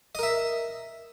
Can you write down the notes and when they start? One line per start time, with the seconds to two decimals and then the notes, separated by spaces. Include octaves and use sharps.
0.15 D#5
0.19 A#4
0.23 E5